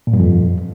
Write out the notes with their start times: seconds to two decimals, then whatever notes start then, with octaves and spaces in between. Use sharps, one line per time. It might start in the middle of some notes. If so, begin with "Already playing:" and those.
0.07 A#2
0.13 G2
0.20 F2